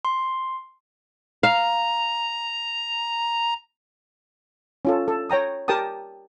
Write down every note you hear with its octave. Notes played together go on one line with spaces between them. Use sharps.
C6
F5 A#5
C#4 F4 A4
A4
C#5 G5 A#5 D#6
G4 A#4 G5 A5 D#6